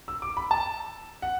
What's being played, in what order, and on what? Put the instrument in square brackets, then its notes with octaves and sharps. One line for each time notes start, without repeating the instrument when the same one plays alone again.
[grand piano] E6
D6
B5
A5
F#5